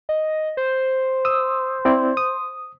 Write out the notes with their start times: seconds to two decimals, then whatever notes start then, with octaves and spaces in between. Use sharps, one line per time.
0.09 D#5
0.57 C5
1.25 D#6 E6
1.85 C4 E4 D5
2.17 D#6